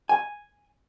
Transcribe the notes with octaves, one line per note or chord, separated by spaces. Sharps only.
G#5